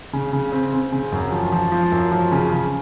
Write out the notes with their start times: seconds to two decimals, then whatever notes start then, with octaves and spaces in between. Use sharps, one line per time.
0.13 C#3
0.33 C#3
0.52 C4
0.73 C4
0.92 C#3
1.12 F#2
1.32 F3
1.52 F3
1.72 F3
1.92 F#2
2.11 F3
2.32 C#3
2.52 C#3